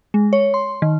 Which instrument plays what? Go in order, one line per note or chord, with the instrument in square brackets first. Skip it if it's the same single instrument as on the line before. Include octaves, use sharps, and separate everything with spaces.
[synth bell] G#3
C#5
C6
D#3